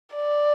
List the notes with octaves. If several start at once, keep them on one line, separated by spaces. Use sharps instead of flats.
D5